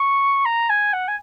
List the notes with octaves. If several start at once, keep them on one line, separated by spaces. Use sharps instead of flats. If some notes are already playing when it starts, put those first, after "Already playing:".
Already playing: C#6
A#5
G#5
F#5
G#5